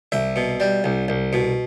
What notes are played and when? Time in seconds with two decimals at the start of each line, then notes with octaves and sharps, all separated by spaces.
0.12 C2 E5
0.36 B2
0.60 G3
0.84 C2
1.08 C2
1.33 B2